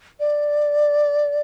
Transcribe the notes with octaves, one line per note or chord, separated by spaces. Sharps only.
D5